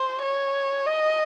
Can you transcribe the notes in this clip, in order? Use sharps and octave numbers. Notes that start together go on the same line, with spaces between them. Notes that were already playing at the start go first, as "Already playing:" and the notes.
Already playing: C5
C#5
D#5